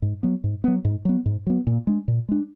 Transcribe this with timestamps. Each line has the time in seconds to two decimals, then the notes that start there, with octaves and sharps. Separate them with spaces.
0.02 G#2
0.23 F#3 B3
0.44 G#2
0.64 F#3 B3
0.85 G#2
1.05 F#3 B3
1.26 G#2
1.47 F#3 B3
1.67 A#2
1.87 G#3 D4
2.08 A#2
2.29 G#3 D4